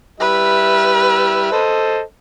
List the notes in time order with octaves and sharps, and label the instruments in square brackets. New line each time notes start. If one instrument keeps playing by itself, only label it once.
[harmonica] G3 E4 E5 [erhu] B4
[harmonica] A4 C5 D#5